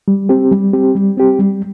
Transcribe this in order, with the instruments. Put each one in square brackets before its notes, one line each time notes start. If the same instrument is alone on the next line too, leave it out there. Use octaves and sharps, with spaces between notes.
[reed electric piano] G3
C4 G4
G3
C4 G4
G3
C4 G4
G3